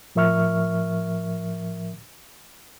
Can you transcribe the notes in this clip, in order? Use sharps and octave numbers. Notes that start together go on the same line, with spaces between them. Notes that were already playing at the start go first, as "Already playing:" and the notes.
A2 F3 A#4 E5 C#6 F6